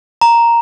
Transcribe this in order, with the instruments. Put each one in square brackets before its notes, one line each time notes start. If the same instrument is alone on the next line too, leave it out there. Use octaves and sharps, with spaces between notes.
[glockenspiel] A#5